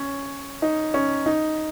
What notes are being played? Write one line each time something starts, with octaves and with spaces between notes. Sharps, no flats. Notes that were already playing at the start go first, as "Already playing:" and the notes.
Already playing: C#4
D#4
C#4
D#4